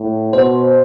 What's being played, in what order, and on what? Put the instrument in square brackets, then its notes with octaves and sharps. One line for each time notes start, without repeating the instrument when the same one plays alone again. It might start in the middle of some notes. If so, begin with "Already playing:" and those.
Already playing: [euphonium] A2
[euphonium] B2 [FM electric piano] C5